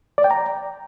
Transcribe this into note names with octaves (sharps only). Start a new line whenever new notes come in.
D5
G5
A#5